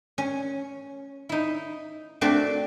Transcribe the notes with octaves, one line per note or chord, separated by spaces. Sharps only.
C#4
D#4 E4
A3 C4 D4 F#4 D5